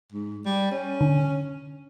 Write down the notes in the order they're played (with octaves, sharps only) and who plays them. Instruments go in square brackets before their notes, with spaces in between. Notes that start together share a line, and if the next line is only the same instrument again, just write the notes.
[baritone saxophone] G#2
G3
C#4
[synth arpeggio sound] D3